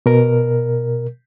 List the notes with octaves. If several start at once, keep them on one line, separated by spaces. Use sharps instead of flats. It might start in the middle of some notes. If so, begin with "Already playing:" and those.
B2 A#4